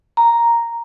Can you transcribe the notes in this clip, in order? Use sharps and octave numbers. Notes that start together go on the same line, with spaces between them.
A#5